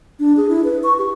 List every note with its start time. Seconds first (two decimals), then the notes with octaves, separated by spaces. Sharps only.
0.20 D4
0.37 G#4
0.49 E4
0.64 B4
0.84 C#6
0.98 G4